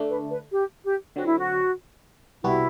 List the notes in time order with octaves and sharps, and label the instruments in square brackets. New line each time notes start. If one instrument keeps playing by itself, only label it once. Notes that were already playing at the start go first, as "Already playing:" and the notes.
Already playing: [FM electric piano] D3 A3 D4
[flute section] B4
B4
G4
G4
[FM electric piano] D3 F#3 C4 [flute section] F#4
[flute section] E4
F#4
[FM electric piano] C2 B2 G3 B3 F#4 [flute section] E4